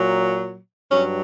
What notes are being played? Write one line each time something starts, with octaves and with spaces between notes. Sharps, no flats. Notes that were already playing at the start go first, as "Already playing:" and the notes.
Already playing: A#2 F#3
G2 F#3 C#4